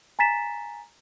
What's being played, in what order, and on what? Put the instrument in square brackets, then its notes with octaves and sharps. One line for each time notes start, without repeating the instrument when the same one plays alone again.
[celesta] G#5 A#5 A6 B6 E7